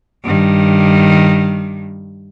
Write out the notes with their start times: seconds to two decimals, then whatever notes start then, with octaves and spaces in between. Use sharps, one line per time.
0.23 G2 D#3